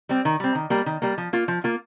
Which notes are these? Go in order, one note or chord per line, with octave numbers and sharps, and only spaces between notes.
G3 C4
D#3
G3 C4
D#3
G3 A#3
D#3
G3 A#3
F3
A#3 F4
F3
A#3 F4